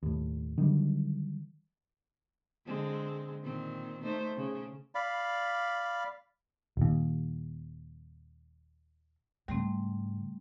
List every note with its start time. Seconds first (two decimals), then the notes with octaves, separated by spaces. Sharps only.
0.03 D#2 A2
0.58 D3 D#3 F#3 G3
2.66 D3 G#3 C4
3.43 A#2 D#3 C4
4.04 A3 D#4 C5
4.36 C#3
4.95 D5 F5 B5
6.77 D#1 D#2
9.48 G#2 C#3 G3 A3 C4